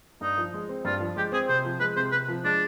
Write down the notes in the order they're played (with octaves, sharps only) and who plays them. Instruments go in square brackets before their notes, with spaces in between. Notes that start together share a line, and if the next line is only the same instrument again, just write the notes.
[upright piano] G2 [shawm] D#4
[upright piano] F3
G#3
C4
[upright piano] G2 [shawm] F4
[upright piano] F3
[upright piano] G#3 [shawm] G4
[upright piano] C4 [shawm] G#4
[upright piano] C3 [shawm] C5
[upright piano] F3
[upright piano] G#3 [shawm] B4
[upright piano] C3 [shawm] C5
[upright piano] C3 [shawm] B4
[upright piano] F3
[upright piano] G#3 [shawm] D4